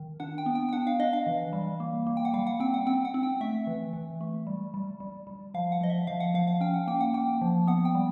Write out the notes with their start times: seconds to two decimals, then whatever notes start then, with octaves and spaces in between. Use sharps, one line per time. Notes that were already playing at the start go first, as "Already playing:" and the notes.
Already playing: D#3
0.20 D4 F#5
0.38 G5
0.46 B3
0.55 G5
0.69 G5
0.73 D4 F#5
0.87 F5
1.00 D4 D#5
1.13 F5
1.26 E3
1.53 G3
1.80 A#3
2.07 A#3
2.17 G5
2.25 F#5
2.34 G3 F5
2.47 F#5
2.60 C4 G5
2.74 F#5
2.86 C4 G5
3.05 F#5
3.14 C4
3.23 G5
3.41 A3 E5
3.67 E3
3.93 E3
4.21 A3
4.47 G3
4.74 G3
5.00 G3
5.27 G3
5.54 F3 F5
5.72 F#5
5.81 F3 D#5
5.90 E5
6.07 F3 F5
6.20 F#5
6.34 F3 F5
6.48 F5
6.61 C#4 G5
6.74 F#5
6.87 A#3 G5
7.01 F#5
7.14 A#3 G5
7.41 F3
7.67 B3 F#5
7.85 G5
7.95 G3